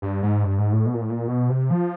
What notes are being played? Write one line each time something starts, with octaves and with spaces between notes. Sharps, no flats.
G2
G#2
G2
G#2
A2
B2
A#2
A2
A#2
B2
C3
F3